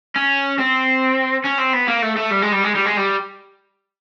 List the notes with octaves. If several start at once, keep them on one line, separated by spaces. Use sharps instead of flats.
C#4
C4
C#4
C4
B3
A#3
A3
A3
G3
G#3
G3
G#3
G3
G#3
G3